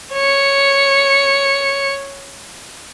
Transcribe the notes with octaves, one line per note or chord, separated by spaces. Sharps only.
C#5 C#7